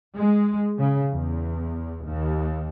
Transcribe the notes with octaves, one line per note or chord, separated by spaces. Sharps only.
G#3
C#3
E2
D#2